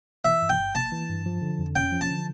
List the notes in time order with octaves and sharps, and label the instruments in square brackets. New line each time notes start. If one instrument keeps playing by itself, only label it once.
[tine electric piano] E3 [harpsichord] E5
[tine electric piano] G2
[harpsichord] G5
[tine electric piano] G1
[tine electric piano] A#3 [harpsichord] A5
[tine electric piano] E3
G2
F3
D3
F2
[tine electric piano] C#4 [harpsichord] G5
[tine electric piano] F3
[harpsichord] A5
[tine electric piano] D3